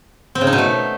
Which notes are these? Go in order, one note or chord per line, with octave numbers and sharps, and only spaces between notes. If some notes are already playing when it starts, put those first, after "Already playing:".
C4
C#3
D#4
B2
A3